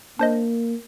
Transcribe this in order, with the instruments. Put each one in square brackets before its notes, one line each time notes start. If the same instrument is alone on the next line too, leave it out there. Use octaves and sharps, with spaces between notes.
[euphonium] A#3 [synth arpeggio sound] D4 C5 D#5